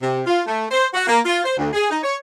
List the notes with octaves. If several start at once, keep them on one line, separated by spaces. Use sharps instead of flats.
C3
F4
A3
C5
F#4
A#3
F4
C5
D2
G#4
D#4
C#5